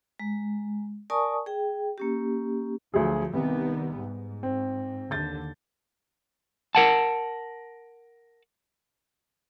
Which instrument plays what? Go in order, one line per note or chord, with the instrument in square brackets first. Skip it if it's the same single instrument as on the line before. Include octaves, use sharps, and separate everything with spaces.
[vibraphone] G#3
A#4 D5 G#5 A5 C#6 D#6
G#4 G5
A#3 C#4 G4
[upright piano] D2 F#3 G#4 [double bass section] F3
[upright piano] C2 [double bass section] D#3 G3 B3
[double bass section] G#2
[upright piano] C4
[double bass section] D#2 D3 [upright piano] G6 A6
[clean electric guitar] A#4 F#5 A5